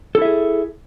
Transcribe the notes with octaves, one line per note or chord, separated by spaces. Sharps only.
E4 G#4 A4 E5